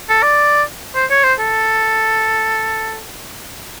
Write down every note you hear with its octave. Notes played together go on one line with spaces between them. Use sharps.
A4
D5
C5
C#5
C5
A4